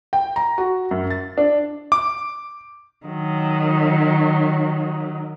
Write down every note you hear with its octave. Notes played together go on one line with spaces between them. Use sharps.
G5
A#5
F#4
F#2
A6
D4
D6
D#3 F#3